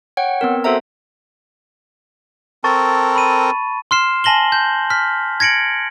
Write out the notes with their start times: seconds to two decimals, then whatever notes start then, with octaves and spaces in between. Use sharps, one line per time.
0.17 C#5 F#5 G5
0.41 B3 C4 A#4
0.64 B3 F#4 A4 C5 E5 A#5
2.64 C4 A4 A#4 A5 C#6 A6
3.16 B5 D#7
3.91 C6 F6 C7 E7
4.24 G#5 A5 A#6 F#7 G7
4.52 G6
4.90 F6 B6
5.40 G#6 A#6 C#7 D7 F#7